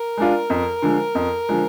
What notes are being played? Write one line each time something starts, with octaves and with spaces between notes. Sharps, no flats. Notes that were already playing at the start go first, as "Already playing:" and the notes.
Already playing: A#4
G#3 D4 F4
F2
D3 F3 G#3
F2
D3 F3 G#3